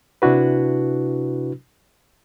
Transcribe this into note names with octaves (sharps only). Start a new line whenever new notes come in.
C3 D4 E4 F#4 B4